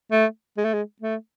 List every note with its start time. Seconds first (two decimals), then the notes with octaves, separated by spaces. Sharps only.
0.12 A3
0.57 G#3
0.65 A3
0.74 G#3
1.02 A3